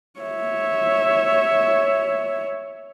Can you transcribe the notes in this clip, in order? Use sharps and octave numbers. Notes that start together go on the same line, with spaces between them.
C#5 E5